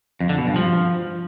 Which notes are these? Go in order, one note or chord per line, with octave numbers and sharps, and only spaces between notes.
F2
D3
B2
G2
F3